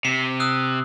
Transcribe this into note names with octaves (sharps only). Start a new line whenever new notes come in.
C3 C7
D#6 E6 F#6